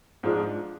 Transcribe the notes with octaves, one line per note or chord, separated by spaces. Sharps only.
G#2 F3 G#3 D4 F4